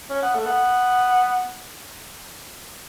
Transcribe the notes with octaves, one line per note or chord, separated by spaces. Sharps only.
C#4
B3
A3
B3